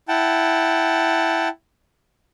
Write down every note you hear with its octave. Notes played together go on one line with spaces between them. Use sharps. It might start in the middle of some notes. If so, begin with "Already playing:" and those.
E4 F#5 G5 A5